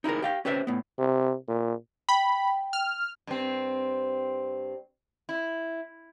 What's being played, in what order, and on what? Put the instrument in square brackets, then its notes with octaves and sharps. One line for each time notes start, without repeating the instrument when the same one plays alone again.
[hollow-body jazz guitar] D#4 E4 G4 G#4 A#4
G4 F5 G5
C#4 G4 B4 C5 E5
A2 B3
[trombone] C3
A#2
[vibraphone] G5 [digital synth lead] B5
[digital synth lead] F6
[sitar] G2 C4
E4